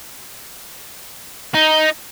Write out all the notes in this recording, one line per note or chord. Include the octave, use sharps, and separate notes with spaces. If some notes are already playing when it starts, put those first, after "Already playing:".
D#4